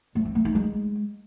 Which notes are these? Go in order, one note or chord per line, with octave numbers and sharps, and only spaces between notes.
A3
C4
A3
D#4
G#3